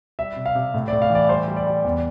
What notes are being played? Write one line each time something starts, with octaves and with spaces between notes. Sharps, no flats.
G3 E5
C3
F5
C3
A2
D5
A2
F5
E3 D5
G3 C5
G3
D5
G3
E2